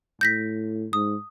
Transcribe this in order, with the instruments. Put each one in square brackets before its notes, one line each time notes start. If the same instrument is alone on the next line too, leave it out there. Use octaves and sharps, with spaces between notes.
[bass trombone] A2 [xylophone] G6 A#6 B6
[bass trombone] G#2 [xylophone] D#6